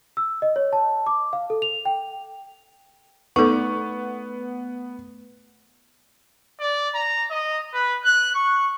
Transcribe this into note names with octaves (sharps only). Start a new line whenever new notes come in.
E6
D#5
C#5
A5
D6
F5
A4
F7
G5
A3 B3 D#4 A4 C#6
D5
A#5
D#5
B4
F#6
C#6